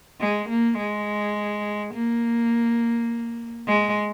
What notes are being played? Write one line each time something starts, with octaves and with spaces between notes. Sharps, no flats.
G#3
A#3
G#3
A#3
G#3